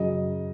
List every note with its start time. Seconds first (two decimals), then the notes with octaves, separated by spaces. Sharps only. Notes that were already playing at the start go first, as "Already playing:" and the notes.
Already playing: F#2 C#3 F#3 D#5